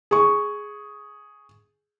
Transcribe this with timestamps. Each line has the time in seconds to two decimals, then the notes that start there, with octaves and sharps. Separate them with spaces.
0.11 G#4 C#6